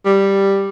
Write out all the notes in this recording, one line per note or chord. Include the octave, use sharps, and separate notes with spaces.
G3